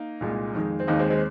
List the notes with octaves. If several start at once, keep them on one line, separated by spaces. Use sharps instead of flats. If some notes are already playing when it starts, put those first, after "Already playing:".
Already playing: A#3 D#4
C2 A#2 G#3
F2 D#3 G#3
C4
D#2 D#3 G#3 A#3 D#4
G#3 C4
G#3 C4